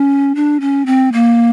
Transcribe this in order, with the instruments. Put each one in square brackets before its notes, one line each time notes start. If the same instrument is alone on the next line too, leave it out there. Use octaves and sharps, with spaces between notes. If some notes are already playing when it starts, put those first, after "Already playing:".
Already playing: [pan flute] C#4
D4
C#4
C4
A#3